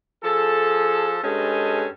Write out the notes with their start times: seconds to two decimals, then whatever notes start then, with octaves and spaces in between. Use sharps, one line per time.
0.23 F3 G#4 A4
1.23 G2 G#3 C#4 A4 D#5